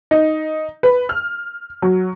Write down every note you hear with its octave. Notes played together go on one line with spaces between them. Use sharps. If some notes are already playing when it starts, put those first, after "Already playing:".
D#4
B4
F6
F#3